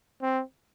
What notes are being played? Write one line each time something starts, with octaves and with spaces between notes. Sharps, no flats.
C4